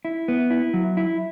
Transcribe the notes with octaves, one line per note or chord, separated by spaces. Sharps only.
E4
B3
E4
F#3
E4